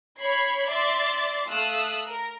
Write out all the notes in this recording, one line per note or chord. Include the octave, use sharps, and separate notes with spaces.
C#5 B5 G#6 C7
D5 E5 C6 A6 C7
A3 F5 D#6 E6 F#6
A#4